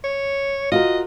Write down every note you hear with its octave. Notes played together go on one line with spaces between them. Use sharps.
C#5
F4 F#4 A#4 D#5